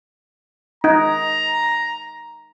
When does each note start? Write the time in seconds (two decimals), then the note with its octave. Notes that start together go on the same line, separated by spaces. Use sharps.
0.84 D#4 A#5